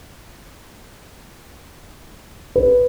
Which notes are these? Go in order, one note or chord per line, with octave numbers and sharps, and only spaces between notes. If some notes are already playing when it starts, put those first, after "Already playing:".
B4